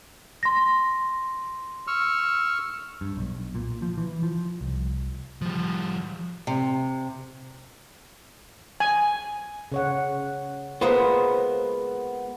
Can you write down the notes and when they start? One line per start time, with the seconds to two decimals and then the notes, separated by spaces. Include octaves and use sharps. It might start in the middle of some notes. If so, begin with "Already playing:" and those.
0.43 C6 A#6
1.87 C#6 E6 F6
3.01 G2
3.17 B1
3.55 A#2
3.82 F3
3.98 E3
4.23 F3
4.61 C2
5.42 F3 G3
6.47 C3
8.80 G#5
9.72 C#3 C#5 F#5
10.81 G#3 A#3 B3 F4 B4 C5